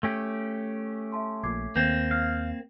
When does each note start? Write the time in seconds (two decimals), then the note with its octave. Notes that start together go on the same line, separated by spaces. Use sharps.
0.03 A3 C#4 G4
1.12 E5 A5 C6
1.44 A#1 A#2 D6 G#6 C7
1.76 D#2 A#3 C4 G6
2.11 F5